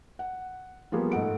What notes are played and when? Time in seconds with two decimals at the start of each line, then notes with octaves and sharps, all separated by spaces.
0.19 F#5
0.92 F3 G3 A#3 B3 G#4
1.12 G#2 A3 F#5 D7